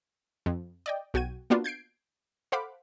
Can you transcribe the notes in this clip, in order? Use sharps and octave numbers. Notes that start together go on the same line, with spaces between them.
F2
D5 D#5 G5
B1 F#4 G5 G#6 D#7
A#3 B3 D4 F4 F#4
G6 G#6 C7 D7
A4 C5 F5 F#5 B5 D6